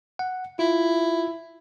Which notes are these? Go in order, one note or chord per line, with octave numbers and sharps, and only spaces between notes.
F#5
E4 F4